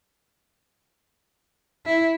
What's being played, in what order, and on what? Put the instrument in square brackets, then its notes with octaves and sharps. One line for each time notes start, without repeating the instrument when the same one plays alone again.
[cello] E4